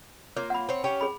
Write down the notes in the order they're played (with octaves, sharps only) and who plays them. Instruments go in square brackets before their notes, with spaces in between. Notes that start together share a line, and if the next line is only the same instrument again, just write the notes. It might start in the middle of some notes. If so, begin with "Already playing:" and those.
[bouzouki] A#3 F4 [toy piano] C#5
[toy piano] F#5 B5
[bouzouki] C4 C#5
C#4 G4 C#5
[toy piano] G#4 B5